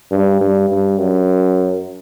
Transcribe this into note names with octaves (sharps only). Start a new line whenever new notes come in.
G2
G2
G2
F#2